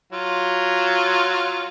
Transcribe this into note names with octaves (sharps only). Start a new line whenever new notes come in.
F#3 F4